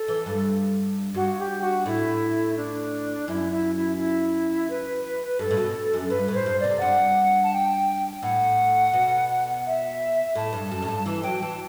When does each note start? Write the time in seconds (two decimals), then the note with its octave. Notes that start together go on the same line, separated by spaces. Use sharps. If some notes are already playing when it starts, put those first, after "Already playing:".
Already playing: A4
0.08 E3
0.26 G2
1.14 G2 F#4
1.38 G4
1.62 F#4
1.86 A2 E4
2.56 D4
3.27 F#2 E4
3.51 E4
3.75 E4
3.98 E4
4.69 B4
5.39 G2 A4
5.51 A2
5.57 B2
5.93 F#2
6.10 G2 B4
6.28 A2
6.34 C5
6.46 G2
6.58 D5
6.64 C3
6.81 G2 F#5
7.43 A5
7.52 G5
8.23 A2 F#5
8.93 B2
9.65 E5
10.35 A2 A5
10.53 G2
10.71 F#2
10.82 A2
10.88 G2
11.06 E3 A5
11.23 F#3 G5
11.42 E3 A5